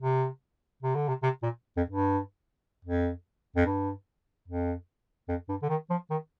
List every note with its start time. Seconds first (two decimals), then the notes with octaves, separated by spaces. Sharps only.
0.01 C3
0.83 C3
0.95 D3
1.08 C3
1.23 C3
1.43 A#2
1.77 F2
1.90 G2
2.85 F2
3.56 F2
3.66 G2
4.48 F2
5.29 F2
5.49 G2
5.62 D3
5.69 D#3
5.90 F3
6.10 D#3